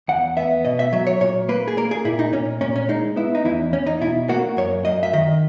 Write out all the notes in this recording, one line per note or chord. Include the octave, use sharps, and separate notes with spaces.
E2 F#5
B3 E5
B2 D#5
E5
F#3 E5
C#5
A#2 C#5
A#3 B4
G#4
A#3 A#4
G#4
A#2 E4
D#4
A#2 C#4
A#2 C#4
C#4
G#3 D#4
B3 E4
D#4
E2 E4
E2 C#4
D#4
B2 E4
A#3 F#4
F#2 C#5
F#2 D#5
E5
D#3 D#5